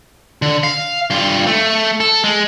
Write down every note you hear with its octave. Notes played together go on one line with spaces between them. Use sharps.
D3
F5
G2 F4
A3
A4
G#3